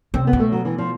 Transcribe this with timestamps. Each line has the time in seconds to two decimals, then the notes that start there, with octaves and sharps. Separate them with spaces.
0.14 C3 C4
0.27 B3
0.33 B2
0.40 A3
0.52 F#3
0.65 E3
0.78 F3